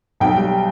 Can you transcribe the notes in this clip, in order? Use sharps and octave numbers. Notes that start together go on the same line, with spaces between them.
B1 G5
G3